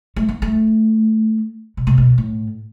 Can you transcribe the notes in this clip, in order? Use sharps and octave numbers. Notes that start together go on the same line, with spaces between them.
A3
B3
A3
B2
C3
B2
A2